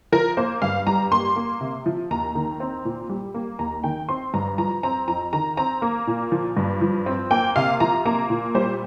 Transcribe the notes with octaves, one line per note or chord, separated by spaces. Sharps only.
F3 A#4
A#3 C5
G2 F5
G3 A#5
A#3 C6
A#3
C3
F3
D#2 A#5
D#3
C4
A#2
G3
A#3
D#2 A#5
D#3 G5
C4 C6
G2 A#5
F3 A#5
C4 A#5
F2 A#5
D#3 A#5
C4 A#5
A#3
A#2
F3
G2
F3
C4
A#3 G5
C3 F5
F3 A#5
A#3 A#5
A#2
G3 C5